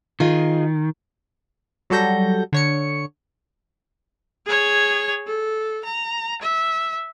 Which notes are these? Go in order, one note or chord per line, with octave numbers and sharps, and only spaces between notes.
D#3 F4 G#4 D#5
F#3 G3 F#4 A4 G6 A#6
D3 C#5 C#7
G#4 C#5
A4
A#5
E5